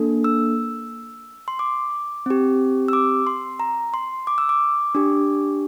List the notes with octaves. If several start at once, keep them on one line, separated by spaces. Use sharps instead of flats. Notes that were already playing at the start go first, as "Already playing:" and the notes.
Already playing: A#3 D4 A4
E6
C6
D6
C4 G4
E6
D6
C6
A#5
C6
D6
E6
D6
D4 G4